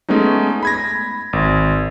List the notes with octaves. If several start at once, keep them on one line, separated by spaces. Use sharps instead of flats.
G#3 A3 B3 C#4 D#4
B5 G#6 A#6
G#1